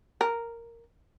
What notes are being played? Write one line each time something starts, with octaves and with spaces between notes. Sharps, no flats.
A#4